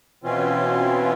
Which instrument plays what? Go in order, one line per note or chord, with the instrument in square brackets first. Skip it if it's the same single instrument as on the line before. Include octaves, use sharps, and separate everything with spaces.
[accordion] B2 E3 C4 C#4 F4